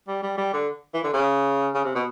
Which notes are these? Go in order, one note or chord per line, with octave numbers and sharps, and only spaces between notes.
G3
G3
G3
D3
E3
D3
C#3
C#3
C3
B2